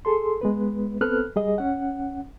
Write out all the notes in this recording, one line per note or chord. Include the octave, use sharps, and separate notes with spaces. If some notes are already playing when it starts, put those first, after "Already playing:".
G#4 A4 C6
G#3 B3 B4
B3 C4 A4 B4 F6 F#6
G3 G#4 D#5
C#4 F#5